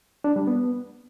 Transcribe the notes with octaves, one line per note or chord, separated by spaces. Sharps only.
D4
G3
B3